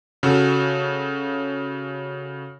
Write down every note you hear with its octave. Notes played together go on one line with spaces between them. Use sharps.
C#3 F#4 A4